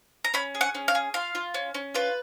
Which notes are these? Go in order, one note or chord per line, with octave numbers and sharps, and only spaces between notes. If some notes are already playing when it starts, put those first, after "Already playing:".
A#5
C#4 B5
G#4
F#5
C#4
F5
G#4
F4 F5
F4
C#4
C#4
F4 B4